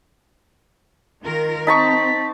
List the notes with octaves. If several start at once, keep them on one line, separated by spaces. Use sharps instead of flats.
D#3 F4 A#4
C4 D#4 A5 C#6 B6